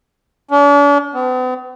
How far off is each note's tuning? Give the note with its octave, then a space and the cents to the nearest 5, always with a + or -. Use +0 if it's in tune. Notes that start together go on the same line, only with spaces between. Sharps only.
D4 -45
B3 +45